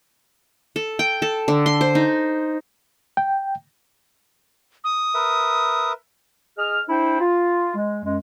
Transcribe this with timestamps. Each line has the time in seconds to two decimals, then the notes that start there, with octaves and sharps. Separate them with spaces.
0.76 A4
0.99 G5
1.22 A4
1.48 D3
1.66 C6
1.81 C5
1.95 D#4
3.17 G5
4.84 D#6
5.15 A#4 B4 E5
6.58 G#4 D#5 F6
6.89 D4 E4 C5 G5
7.20 F4
7.75 G#3
8.04 F#2 G#3